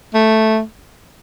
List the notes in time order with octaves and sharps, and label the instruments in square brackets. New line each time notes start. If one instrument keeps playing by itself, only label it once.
[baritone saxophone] A3